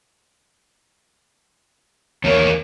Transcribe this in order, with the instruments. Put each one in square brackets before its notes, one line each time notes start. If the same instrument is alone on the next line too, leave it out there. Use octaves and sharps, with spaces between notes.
[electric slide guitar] E2 D#3 A#3 [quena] C#5